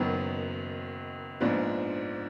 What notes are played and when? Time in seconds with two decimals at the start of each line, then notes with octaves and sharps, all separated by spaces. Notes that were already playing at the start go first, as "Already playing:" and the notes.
Already playing: F#1 F#2 D#3 F#3 B3
1.40 A#1 G#2 F3 B3 D4